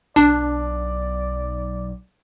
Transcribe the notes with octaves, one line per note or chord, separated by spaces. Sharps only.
B1 D4 D5